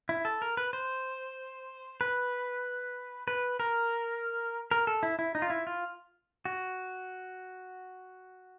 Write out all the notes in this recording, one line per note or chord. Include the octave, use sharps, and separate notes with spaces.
E4
A4
A#4
B4
C5
B4
B4
A#4
A#4
A4
E4
E4
D#4
F4
E4
F4
F#4